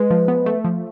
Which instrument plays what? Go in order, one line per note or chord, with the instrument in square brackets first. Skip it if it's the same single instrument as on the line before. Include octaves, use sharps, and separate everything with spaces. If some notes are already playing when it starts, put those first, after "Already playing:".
Already playing: [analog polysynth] G#3 [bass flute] B4
[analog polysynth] F3
B3
A3
F3